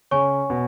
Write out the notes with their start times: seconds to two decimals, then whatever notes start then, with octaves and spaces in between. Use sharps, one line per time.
0.11 C#3 C#5 G#5 C#6
0.50 B2